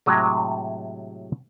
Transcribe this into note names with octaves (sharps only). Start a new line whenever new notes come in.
A2 C3 F#3 G#3